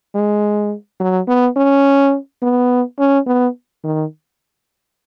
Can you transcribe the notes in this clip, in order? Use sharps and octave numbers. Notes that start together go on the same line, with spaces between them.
G#3
F#3
B3
C#4
B3
C#4
B3
D#3